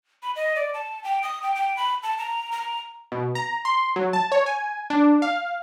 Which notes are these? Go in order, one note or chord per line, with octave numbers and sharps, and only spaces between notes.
B5
D#5
D5
A5
G5
D#6
G5
G5
B5
A5
A#5
A#5
B2
A#5
C6
F#3
A5
C#5
G#5
D4
F5